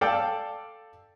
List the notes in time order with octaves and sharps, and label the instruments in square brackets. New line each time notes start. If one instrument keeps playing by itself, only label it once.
[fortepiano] A4 D5 F5 G5 A5